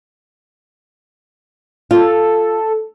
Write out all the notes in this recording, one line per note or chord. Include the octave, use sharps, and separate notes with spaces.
F4 A4